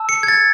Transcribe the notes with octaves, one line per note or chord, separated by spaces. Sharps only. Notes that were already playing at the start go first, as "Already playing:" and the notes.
Already playing: A5 E6
C#7
G#6
A6